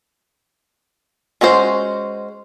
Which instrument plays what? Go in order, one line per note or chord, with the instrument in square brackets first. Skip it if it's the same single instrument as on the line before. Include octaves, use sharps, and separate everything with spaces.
[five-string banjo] G#3 C#4 F#4 C5